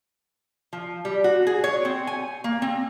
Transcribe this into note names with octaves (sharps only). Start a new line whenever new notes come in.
F3
G3
F#4
G#4
C#5
C4
G#5
A#3
C4